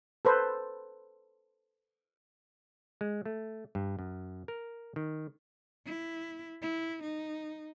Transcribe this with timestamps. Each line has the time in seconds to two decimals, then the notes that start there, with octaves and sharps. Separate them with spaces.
0.25 A4 B4 C5
3.01 G#3
3.25 A3
3.75 G2
3.99 F#2
4.48 A#4
4.96 D#3
5.86 E4
6.62 E4
7.03 D#4